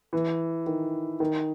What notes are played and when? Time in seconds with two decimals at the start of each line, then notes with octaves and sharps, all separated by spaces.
0.13 E3
0.67 D#3
1.20 D#3